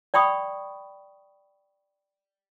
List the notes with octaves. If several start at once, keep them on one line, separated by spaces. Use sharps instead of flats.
D5 G5 B5 C#6 D#6